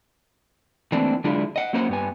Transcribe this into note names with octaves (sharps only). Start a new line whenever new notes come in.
E3 A3 A#3 C4 D4
D3 F#3 G#3 D4 E4 F4
D#5 F#5
F#3 A#3 C#4 A#4 C5 F#5
G2 B3 G#5